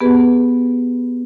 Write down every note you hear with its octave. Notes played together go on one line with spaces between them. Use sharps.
B3 G4 G#4 B4